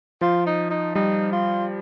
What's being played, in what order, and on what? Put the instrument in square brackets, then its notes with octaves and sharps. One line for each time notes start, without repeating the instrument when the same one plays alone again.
[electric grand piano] F3 [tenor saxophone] F4
[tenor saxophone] D#4
D#4
[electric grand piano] G3 [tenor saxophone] D#4
[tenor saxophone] F4